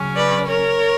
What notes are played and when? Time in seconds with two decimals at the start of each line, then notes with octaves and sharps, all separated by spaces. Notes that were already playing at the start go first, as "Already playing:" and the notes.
Already playing: C#3 F#3 C#4
0.16 B4 D5
0.47 A#4 C#5